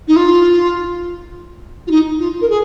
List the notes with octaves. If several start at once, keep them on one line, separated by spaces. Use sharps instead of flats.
D#4
F4
F4
D#4
F4
A#4
G#4